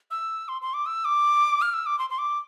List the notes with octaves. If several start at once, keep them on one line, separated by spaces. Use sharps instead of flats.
E6
C6
C6
D6
E6
D6
F6
E6
D6
C6
C6
D6